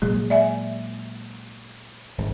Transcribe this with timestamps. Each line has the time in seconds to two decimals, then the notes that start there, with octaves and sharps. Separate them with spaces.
0.02 A#2 F#3 G#3 G#4
0.30 D5 E5 G#5
2.18 G#1 G#2